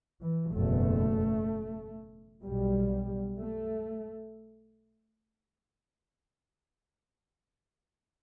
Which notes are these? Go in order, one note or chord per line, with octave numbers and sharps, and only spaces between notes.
E3
F#1 E2 B2 A3
B1 B2 G3
A3